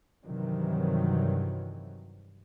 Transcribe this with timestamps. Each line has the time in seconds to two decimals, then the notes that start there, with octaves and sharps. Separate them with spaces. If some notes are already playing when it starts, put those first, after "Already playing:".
0.24 G2 C3 D#3 E3 F#3